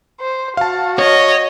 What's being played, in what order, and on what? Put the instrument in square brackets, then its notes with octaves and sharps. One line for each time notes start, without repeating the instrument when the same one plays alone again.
[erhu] C5
[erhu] F#4 [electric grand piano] F5 A5
[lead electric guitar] C#5 [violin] D#5